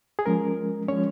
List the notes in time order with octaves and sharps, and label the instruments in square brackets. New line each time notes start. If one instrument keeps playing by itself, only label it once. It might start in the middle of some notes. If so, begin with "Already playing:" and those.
[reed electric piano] G#4
F3 G#3 C#4 A#4
F3 G#3 C#4 C#5